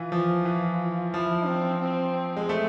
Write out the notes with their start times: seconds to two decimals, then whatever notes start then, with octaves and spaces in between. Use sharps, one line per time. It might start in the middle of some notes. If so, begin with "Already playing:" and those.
Already playing: E3 F4
0.12 F3
0.45 E3
1.13 F3 E4
1.47 C4
1.81 C4
2.37 G#3
2.49 A3